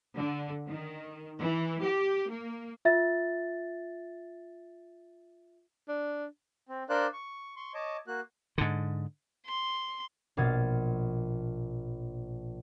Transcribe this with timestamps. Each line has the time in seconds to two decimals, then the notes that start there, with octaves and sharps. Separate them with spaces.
0.17 D3
0.68 D#3
1.39 E3
1.82 G4
2.30 A#3
2.85 F4 E5 A6
5.88 D4
6.69 C4
6.89 D4 A#4 C5 D5 F5 F#6
7.13 C#6
7.56 C6 C#6
7.74 C#5 D#5 A5 D6
8.07 A#3 F#4 F#6
8.58 G#2 D3
9.46 C6
10.37 A#1 B2 F4 G#6 A6